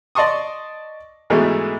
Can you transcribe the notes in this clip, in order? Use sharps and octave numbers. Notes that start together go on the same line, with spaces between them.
D5 D#5 A5 C6 C#6 D#6
G#2 B2 E3 G#3 A3